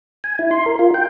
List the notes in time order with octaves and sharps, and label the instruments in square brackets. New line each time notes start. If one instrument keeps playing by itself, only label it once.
[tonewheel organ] G#5
E4
C6
A#4
F4
G5